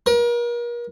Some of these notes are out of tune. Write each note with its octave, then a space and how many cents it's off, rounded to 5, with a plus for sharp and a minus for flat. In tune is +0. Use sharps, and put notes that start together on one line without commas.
A#4 +40